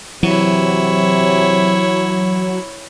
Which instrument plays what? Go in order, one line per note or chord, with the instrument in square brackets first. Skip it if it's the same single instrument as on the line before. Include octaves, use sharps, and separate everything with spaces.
[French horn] C3 [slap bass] E3 [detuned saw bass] F#3 [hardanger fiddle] E4 C#5